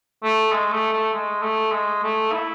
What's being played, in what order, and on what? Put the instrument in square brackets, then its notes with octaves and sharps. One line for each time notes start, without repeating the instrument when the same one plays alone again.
[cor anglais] A3
G#3
A3
A3
G#3
A3
G#3
A3
E4